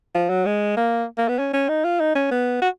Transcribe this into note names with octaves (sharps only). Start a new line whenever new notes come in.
F3
F#3
G#3
A#3
A#3
B3
C#4
C#4
D#4
F4
D#4
C#4
B3
F#4